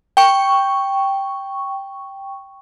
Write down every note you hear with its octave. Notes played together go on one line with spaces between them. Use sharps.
G5 C#6